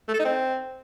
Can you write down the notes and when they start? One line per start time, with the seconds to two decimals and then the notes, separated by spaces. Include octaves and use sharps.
0.08 A3
0.14 A4
0.19 D#4
0.25 C4